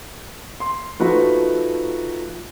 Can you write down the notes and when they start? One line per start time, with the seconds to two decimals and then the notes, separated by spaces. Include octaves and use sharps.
0.60 C6
1.00 F3 A3 D#4 F#4 B4